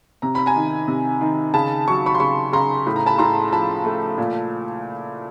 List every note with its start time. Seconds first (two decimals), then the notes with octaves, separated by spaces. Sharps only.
0.22 C3 A#5
0.35 B5
0.46 G#5 A#5
0.56 D#3
0.88 C3
1.21 D#3
1.54 C#3 A5 B5
1.88 F#3 C#6
2.06 B5 C#6
2.15 C6
2.20 C#3 B5 C#6
2.53 C#3 A#5 C6
2.86 A2 B5
2.96 A#5
3.06 A5 B5
3.18 A2 A#5 C6
3.48 A#5
3.51 F3 A5 B5
3.85 A3
4.18 A#2